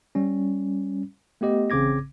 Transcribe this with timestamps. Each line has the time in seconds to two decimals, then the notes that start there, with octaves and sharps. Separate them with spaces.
0.15 G3 C#4
1.41 A3 B3 G4 D#5
1.70 A1 C#3 C4 D6 G#6 A#6